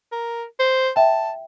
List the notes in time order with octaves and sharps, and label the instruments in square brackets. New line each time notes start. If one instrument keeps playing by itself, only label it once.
[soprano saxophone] A#4
C5
[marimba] E5 G5 [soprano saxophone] A5